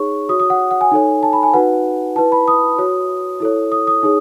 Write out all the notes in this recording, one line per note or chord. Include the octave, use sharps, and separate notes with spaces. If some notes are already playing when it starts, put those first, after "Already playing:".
Already playing: D#4 G#4 C#5 C#6
F#4 C#5 D#6
D#6
F#5
F#5
G#5
D#4 A4 C#5
A5
B5
G#5
D#4 F#4 B4 F#5
E4 B4 A5
B5
D#6
F#4 C#5
E4 A4 C#5
D#6
D#6
D#4 G#4 C#5